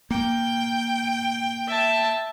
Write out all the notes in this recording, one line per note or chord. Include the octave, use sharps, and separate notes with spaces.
A#3 G5
E5 A5